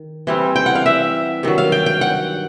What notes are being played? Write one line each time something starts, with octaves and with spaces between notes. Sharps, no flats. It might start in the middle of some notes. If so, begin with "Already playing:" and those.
Already playing: D#3
E3 G3 C4
G5
F#5
F5
E5
G2 D#3 F#3
F5
G5
G5
F#5